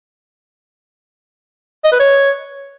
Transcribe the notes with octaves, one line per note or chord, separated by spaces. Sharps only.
D#5
B4
C#5